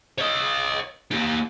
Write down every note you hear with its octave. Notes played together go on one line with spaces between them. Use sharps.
C#5 D#5
A#3 G4